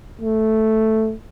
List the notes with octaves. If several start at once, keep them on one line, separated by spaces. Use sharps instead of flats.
A3